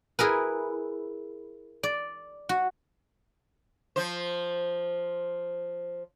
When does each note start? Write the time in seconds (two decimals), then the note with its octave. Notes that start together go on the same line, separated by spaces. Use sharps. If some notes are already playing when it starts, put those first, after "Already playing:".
0.19 E4 G#4 A#4 B4
1.83 D5
2.49 F#4
3.96 F3 C5